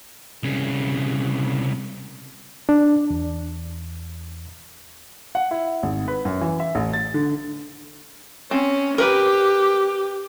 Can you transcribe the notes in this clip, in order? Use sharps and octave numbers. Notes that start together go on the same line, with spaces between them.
C2 C#3
D4
E2
F#5
E4
G#1
B4
F#2
E3
E5
A1
A6
D3
C4 C#4
G4 A#4 B4